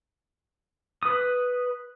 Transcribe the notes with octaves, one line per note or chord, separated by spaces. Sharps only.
B4 D#6